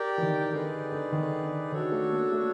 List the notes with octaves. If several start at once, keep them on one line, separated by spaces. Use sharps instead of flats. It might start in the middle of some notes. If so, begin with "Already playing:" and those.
Already playing: G4 A#4 D5 G5
E3
D#3
D3 D#4 G#4 B4 D5
D3
D#3
D3
D#3 D4 F#4 A4 C#5
A3
A#3
A3